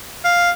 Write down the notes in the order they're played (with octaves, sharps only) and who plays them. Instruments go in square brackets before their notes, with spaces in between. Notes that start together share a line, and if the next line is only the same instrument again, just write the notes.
[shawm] F5